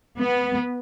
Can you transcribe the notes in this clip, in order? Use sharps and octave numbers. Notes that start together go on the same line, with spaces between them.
B3